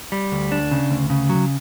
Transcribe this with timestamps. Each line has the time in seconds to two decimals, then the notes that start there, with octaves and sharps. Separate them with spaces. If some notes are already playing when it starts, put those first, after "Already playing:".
0.12 G3
0.32 D2
0.52 D4
0.71 C#3
0.90 D2
1.10 C#3
1.29 F#3